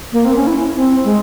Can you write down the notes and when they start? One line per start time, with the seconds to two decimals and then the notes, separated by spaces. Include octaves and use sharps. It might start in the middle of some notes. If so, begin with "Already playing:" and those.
0.13 A#3
0.25 C4
0.36 C#4
0.47 E4
0.76 C4
1.05 G#3